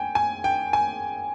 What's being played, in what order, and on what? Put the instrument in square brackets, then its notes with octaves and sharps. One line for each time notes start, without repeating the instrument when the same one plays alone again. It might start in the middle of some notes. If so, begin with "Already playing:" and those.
Already playing: [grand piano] G5 G#5
G#5
G5
G#5